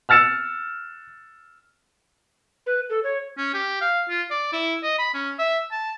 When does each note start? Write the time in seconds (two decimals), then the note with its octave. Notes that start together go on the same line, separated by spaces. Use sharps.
0.09 E6 F6 A6 C#7 E7
2.66 B4
2.90 A4
3.04 C#5
3.38 C#4
3.54 G4
3.81 F5
4.10 F4
4.30 D5
4.53 E4
4.83 D#5
4.99 B5
5.14 C#4
5.39 E5
5.72 A5